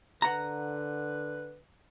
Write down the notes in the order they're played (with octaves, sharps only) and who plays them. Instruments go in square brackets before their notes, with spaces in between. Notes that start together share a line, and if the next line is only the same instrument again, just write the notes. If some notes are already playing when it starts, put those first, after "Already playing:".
[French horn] D3 [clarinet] B4 [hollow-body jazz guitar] F#5 A#5